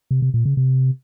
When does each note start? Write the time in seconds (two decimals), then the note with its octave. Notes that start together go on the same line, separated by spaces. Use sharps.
0.11 C3
0.22 C3
0.34 A#2
0.45 C#3
0.57 C3